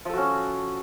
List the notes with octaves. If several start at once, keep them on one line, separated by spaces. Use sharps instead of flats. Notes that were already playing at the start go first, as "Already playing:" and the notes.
F3 C#4 F#4 A4